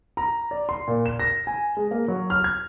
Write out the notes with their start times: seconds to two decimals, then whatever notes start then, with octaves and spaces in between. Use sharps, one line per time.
0.17 A#5
0.51 D5
0.69 C6
0.88 A#2
1.06 E7
1.20 A#6
1.47 G#5
1.77 G#3
1.91 A#3
2.08 F#3
2.30 F6
2.44 G#6